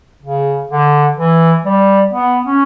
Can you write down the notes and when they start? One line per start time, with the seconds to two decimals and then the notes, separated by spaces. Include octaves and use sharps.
0.22 C#3
0.70 D3
1.17 E3
1.65 G3
2.13 B3
2.44 C#4